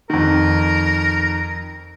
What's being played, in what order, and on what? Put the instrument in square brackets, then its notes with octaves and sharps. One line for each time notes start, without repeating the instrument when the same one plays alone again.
[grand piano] F2 D#3 [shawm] A#4